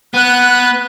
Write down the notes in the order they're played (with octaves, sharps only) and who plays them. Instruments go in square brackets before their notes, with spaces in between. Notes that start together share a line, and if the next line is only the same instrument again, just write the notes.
[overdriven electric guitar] B3 [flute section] F#6